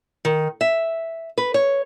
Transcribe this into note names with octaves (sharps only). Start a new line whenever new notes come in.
D#3
E5
B4
C#5